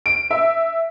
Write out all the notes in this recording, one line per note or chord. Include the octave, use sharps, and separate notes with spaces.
D7
E5